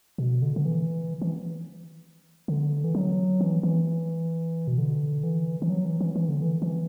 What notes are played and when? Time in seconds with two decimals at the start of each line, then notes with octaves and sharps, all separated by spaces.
0.18 B2
0.42 D3
0.56 D3
0.65 E3
1.22 E3
2.48 D3
2.84 E3
2.95 F#3
3.41 E3
3.63 E3
4.68 B2
4.78 D3
5.23 E3
5.62 E3
5.69 F#3
5.85 E3
6.01 E3
6.16 E3
6.29 D3
6.42 E3
6.62 E3